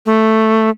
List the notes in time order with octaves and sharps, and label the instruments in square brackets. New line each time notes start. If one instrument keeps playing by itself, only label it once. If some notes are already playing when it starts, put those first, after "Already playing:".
[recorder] A3